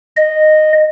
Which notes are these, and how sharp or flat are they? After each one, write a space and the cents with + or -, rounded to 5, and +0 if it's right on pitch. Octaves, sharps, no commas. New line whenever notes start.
D#5 -10